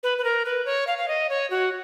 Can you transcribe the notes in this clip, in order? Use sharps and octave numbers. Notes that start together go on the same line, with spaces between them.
B4
B4
A#4
B4
C#5
F5
F5
D#5
C#5
F#4